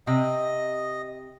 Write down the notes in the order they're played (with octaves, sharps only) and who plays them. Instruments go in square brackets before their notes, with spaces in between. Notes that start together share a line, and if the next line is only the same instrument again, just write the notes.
[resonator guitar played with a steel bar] C3 G5 [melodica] D#5